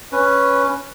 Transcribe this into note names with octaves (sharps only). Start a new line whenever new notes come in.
C#4 B4